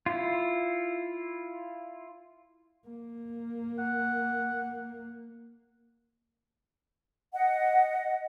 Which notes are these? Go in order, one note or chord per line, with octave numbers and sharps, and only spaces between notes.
E4 F4
A#3
F#5
D#5 F#5